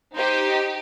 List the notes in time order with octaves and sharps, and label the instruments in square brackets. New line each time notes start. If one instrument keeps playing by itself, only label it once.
[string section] D#4 G4 [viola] C5